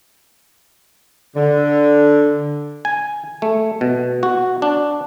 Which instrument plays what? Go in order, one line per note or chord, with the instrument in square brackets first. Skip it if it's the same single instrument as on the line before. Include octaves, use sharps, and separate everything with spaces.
[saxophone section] D3
[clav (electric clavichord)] G#5
A3
B2
F#4
D4